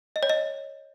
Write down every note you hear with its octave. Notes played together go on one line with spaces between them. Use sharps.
D#5
C#5
D#5